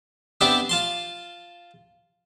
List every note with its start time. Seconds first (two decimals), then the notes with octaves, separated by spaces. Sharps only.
0.41 B3 C4 D4 G4 D5 E5
0.69 F4 A5 C6